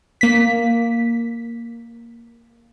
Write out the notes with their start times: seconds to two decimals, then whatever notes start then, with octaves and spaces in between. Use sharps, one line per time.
0.21 A#3 B6